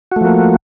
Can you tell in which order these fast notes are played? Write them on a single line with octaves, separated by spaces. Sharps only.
F#4 A3 F3 A#3